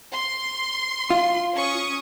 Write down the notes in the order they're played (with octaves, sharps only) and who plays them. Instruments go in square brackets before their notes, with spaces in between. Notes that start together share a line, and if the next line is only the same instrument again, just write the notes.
[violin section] C6
[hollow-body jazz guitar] F4
[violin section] C#4 C#6 D#6